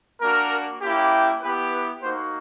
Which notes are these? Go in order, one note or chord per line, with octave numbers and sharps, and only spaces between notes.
A#3 D4 F#4 A#4
A#3 C#4 E4 G4
B3 E4 G4 B4
B4
A#3 D#4 F#4 C5